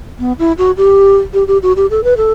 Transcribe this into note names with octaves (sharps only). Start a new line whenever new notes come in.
B3
E4
F#4
G4
G4
G4
F#4
G4
A4
B4
A4